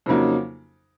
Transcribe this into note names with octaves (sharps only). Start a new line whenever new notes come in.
F2 C#3 F#3 A#3 D#4